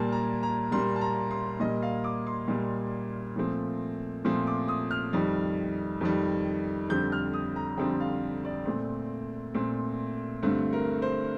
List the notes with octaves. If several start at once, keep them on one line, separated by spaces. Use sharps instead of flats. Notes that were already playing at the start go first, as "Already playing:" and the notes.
Already playing: A#2 G3 A#3 A5
A#5
A#5
A#2 G3 A#3 C6
A5
A#5
C6
A#2 G3 A#3 D#5
F5
D6
C6
A#2 G3 A#3
A#2 F3 A3 C4
A#2 F3 A3 C4 C6
D6
D#6
F6
F2 D#3 G3
F2 D#3 G3
F2 D3 G3 C4 G6
F6
D#6
A#5
F2 D3 G3 C4 G5
F5
D5
A#2 A3 C4
A#2 A3 C4
G2 D3 A3 C4
A#4
C5